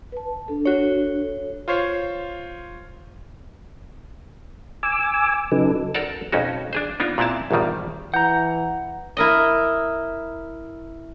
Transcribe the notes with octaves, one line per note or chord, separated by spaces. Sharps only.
B4 A5
D4 A4
F#4 C#5
F4 C5 C#5 C7
G#5 D6 E6
C#3 F#3 D#4 A4 B4
A4 A#4 C5 D5 F#5 A5
B1 F2 C#4 D#4 F#4
D4 G#4 C5
B3 D4 D#4 F4
A#2 B3 C4 E4 A5
A#1 E2 G2 D#3 G3
E3 F#5 A#5 G6
E4 A#4 D#5